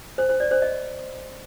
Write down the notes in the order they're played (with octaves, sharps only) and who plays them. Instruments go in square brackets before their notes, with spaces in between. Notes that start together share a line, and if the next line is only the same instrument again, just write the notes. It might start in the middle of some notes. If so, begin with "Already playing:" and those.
[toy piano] C5
C5
D5
C5
D#5